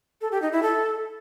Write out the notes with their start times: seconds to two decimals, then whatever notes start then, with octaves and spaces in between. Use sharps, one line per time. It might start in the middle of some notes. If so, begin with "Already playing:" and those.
0.21 A4
0.32 G4
0.42 D#4
0.52 E4
0.63 A4